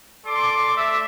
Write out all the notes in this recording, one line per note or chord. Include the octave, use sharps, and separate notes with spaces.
A4 D5 C6 D6
A3 D5 E5